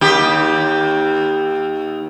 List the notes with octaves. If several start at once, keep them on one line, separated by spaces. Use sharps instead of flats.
D#2 G4